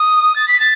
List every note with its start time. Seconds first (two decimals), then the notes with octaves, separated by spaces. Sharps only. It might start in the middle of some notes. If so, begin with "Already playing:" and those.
Already playing: D#6
0.36 A6
0.48 B6
0.60 A6